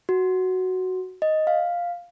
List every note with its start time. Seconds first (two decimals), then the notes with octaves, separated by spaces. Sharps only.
0.09 F#4
1.22 D#5
1.47 F5